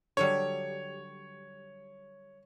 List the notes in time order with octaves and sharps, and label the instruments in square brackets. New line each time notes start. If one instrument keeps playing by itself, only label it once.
[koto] D3 F#3 G3 [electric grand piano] C#5